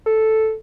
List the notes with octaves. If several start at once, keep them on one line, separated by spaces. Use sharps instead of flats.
A4